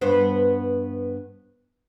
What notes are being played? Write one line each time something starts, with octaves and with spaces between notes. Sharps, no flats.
G2 B3 C5